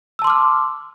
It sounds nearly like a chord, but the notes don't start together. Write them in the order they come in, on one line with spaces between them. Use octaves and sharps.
E6 A5 C6 D6 F6